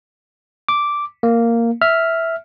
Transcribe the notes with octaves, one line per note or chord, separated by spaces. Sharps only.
D6
A#3
E5 F6